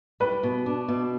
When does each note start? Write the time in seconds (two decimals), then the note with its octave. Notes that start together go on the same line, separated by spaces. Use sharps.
0.20 G3 B4
0.43 B2
0.66 D4
0.88 B2